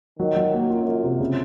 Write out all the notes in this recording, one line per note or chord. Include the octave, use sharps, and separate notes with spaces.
D#3 F#3
F#3
A#3
F#2 F4
F4
C3
C#3